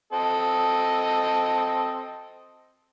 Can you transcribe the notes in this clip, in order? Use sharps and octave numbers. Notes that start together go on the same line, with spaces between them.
C4 A4 D#5